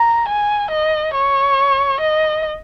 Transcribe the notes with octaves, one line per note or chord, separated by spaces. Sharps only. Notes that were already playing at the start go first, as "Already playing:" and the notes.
Already playing: A#5
G#5
D#5
C#5
D#5